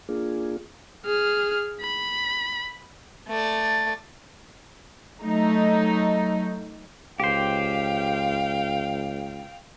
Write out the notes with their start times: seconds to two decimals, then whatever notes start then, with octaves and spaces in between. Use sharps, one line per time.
0.09 A#3 D4 F4 G#4
1.05 G#4 F6
1.81 B5
3.28 A3 D5
5.22 F#3 A3 D#4
7.20 C#2 G4 C5 F5 G5